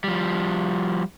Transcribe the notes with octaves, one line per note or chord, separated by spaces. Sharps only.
F3 G3